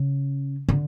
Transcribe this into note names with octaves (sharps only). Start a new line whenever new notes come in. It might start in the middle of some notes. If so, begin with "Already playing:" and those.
Already playing: C#3
D3